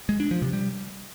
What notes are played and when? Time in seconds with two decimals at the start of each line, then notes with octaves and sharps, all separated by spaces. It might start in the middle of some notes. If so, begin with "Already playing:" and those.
0.09 G#3
0.20 D4
0.31 F3
0.42 C3
0.53 G3